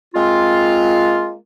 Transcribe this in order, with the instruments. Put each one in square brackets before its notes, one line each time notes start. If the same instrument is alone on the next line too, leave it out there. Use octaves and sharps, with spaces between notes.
[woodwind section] G#3 A#3 C4 F4